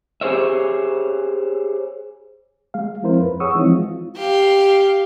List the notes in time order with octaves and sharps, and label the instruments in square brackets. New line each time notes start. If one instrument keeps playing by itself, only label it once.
[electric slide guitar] G4 G#4 C5 C#5 E5
[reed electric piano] G#3 F5
F3 C4 E4 A#4 C5
F2 B4
G#4 C#5 F#5 C#6 D#6 E6
E3 F3 G#3 C4 D#4 E4
F4
[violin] G4 F5